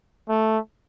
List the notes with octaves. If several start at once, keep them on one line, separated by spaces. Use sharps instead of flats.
A3